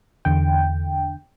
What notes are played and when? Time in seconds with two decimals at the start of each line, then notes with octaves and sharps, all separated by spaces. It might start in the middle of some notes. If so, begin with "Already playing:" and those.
0.25 E2 D3 G5